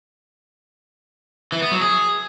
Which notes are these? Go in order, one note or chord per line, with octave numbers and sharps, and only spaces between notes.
E3
B3
F#3
G#4